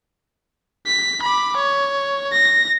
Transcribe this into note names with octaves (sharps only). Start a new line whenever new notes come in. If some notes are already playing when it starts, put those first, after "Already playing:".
B6
B5 D6
C#5
A#6